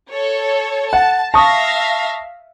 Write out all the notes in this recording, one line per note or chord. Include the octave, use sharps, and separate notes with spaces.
A4 C#5
F#5 A5
E5 F5 A5 C#6 D#6 A#6